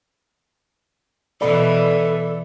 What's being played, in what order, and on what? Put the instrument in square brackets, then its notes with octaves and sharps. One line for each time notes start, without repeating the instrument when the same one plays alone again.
[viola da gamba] B2 E3 [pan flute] A4 [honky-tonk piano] D5 B5